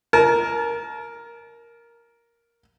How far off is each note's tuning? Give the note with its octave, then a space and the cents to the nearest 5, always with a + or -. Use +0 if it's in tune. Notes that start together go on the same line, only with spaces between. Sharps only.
A#4 +5 A5 -35